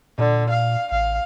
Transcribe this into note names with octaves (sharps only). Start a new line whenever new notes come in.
A#2 D3
F5
A1 F5